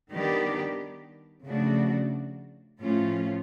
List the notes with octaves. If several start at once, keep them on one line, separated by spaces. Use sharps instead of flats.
D#3 G3 B3 D4 G4
C#3 F3 A3 D4 F#4
A2 F3 A3 C#4 F4